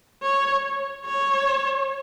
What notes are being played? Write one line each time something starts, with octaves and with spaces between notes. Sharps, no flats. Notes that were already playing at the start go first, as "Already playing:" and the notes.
C#5
C#5